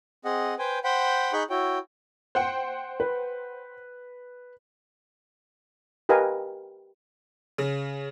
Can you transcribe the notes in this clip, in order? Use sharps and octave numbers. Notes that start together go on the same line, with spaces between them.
C4 G#4 D#5 F#5
B4 C5 G5 G#5
C5 F#5 G5 B5
D#4 G#4 B5 C#6 F#6 G6
E4 F#4 C#5 G5
C5 F#5 G5
B4
G4 A#4 B4 D#5 F5 G#5
C#3